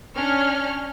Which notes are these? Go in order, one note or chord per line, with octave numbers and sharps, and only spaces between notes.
C#4 D4 C#6 F6